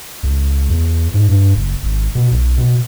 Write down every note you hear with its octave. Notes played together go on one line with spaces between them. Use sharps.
C#2
E2
G#2
G2
F#1
G#1
B2
B1
B2